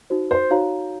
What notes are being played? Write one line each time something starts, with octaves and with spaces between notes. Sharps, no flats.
D#4 F#4 C5
C5
D#4 F#4 C#5 F5 A#5